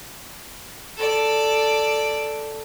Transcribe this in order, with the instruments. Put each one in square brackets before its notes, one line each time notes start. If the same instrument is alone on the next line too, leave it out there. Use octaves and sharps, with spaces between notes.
[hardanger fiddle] A4 D5